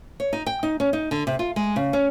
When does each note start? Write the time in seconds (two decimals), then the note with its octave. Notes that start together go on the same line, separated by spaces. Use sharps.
0.20 C#5
0.33 D#4
0.46 G5
0.63 D#4
0.80 C#4
0.93 D#4
1.11 D3
1.27 C3
1.39 F4
1.56 G#3
1.76 C#3
1.93 C#4